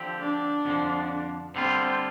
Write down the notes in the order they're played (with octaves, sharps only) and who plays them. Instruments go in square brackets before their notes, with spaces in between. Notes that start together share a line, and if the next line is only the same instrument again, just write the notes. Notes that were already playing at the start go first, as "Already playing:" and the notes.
Already playing: [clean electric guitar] D3 F3 C4 G4
[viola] D4
[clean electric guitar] F2 D3 F3
[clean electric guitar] D3 G3 F4 [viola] C4